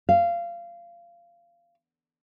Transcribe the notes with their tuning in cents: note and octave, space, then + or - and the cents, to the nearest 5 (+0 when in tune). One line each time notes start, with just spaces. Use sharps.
F5 -20